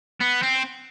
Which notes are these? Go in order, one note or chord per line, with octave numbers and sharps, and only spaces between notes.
B3
C4